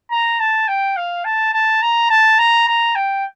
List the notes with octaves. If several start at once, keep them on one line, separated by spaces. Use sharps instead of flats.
A#5
A5
G5
F5
A5
A5
A#5
A5
A#5
A#5
G5